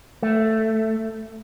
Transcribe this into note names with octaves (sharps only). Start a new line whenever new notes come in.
A3